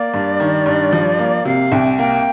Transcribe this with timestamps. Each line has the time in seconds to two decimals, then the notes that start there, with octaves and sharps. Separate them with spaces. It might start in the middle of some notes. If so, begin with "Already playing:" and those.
Already playing: A#3 D5
0.14 G2
0.40 D#3
0.66 G2
0.93 F3
1.19 A#3
1.45 C3 F5
1.72 C2 G5
1.99 A#3 G5